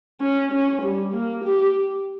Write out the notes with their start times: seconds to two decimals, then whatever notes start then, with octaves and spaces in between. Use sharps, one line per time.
0.21 C#4
0.52 C#4
0.82 G3
1.13 A#3
1.44 G4